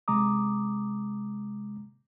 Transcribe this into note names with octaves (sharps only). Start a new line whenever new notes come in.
C3 G#3 A#5 D6 D#6